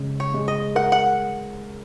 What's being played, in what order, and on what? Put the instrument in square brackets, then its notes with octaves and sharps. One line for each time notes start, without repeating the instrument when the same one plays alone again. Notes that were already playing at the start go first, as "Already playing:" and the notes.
Already playing: [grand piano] C#3 G#3
[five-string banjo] C#5
[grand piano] G#3
[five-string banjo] D#5
[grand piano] A#4 [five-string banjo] F#5
[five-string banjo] F#5